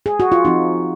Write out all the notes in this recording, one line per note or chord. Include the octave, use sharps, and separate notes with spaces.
G#4
F#4
F4
F3 C4 D#4